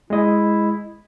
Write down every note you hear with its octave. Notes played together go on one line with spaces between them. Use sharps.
G#3 E4 D#5